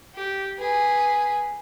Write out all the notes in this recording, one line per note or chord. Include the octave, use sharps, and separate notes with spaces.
G4
G#4 B4